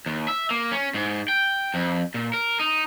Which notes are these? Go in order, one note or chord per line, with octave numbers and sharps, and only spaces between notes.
D#2
E5
A#3
C#4
G#2
G5
F2
A#2
A#4
D#4